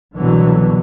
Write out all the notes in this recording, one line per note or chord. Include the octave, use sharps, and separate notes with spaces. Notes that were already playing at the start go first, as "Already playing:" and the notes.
C2 B2 D3 E3 F#3